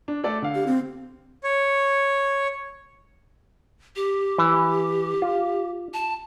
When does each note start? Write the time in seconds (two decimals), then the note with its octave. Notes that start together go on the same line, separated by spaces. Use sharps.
0.08 D4
0.24 A3 A4 D5
0.42 D3 F5
0.55 G4
0.67 C4
1.43 C#5
3.96 G4
4.38 E3
5.22 F4
5.94 A5